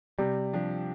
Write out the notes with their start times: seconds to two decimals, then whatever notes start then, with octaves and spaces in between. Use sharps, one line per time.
0.19 C3 G3
0.53 F3 D4 G4